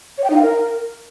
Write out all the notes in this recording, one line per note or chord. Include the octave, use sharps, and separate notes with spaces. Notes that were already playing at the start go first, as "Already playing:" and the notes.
C#5
G5
D#4
F5
A#4